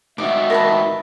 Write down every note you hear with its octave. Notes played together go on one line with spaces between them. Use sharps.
G#2 D#4 F#4 E5 D6
A#4 B4 A5